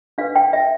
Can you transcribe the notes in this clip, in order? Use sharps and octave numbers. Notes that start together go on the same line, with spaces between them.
D4 G4 B4 F5
G5
E5